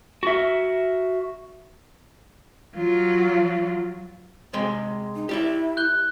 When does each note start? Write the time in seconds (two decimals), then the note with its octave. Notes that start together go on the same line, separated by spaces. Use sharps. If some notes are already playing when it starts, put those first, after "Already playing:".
0.23 F#4 E5
2.76 F#3 F4
4.53 C3 G#3 G5
5.15 D#4
5.29 E4 G4 D5 E5
5.77 F#6 G6 G7